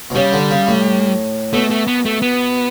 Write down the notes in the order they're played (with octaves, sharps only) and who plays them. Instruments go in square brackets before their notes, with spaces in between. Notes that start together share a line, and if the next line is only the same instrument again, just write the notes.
[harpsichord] B2
[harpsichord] C#3 [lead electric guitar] G3
[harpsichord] D3
C#3
A2
[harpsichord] B2 [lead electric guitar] A3
[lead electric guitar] A3
B3
A3
B3